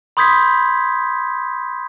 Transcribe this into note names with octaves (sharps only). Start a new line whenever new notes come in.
B5 C6 D#6 G6 G#6 B6